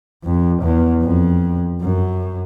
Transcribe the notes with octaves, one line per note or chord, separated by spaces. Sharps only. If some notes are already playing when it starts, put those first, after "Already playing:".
F2
E2
F2
F#2